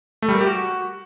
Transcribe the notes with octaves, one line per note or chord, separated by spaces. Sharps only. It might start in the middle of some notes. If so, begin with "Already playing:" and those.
A3
G3
A#4
G4
F#4